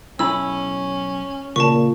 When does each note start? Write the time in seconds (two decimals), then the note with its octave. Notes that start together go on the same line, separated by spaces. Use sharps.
0.19 B1 C#4 E4 B5 E6
1.56 A#2 C#3 A5 C#6